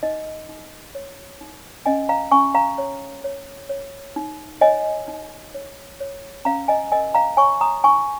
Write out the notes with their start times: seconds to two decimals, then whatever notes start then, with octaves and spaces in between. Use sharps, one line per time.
0.03 D#4 D#5
0.49 D#4
0.95 C#5
1.41 D#4
1.86 C#4 D#5 G#5
2.09 F5 A#5
2.32 C#4 G#5 C#6
2.55 F5 A#5
2.78 C#5
3.24 C#5
3.69 C#5
4.16 D#4
4.61 C#5 D#5 G#5
5.08 D#4
5.54 C#5
6.00 C#5
6.45 C#4 F5 A#5
6.68 D#5 G#5
6.92 A#4 D#5 G#5
7.14 F5 A#5
7.37 C#5 G#5 C#6
7.61 A#5 D#6
7.84 D#4 G#5 C#6